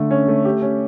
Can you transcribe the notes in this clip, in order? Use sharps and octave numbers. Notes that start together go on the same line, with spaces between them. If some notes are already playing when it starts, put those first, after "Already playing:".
Already playing: D3 A3
C#4
A3
G4
C#4